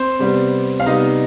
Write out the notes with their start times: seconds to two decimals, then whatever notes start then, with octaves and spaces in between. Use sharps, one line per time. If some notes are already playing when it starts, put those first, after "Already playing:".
Already playing: C4 C5
0.19 C3 G3 B3
0.80 F5
0.86 C3 G3 B3 D#4 D#5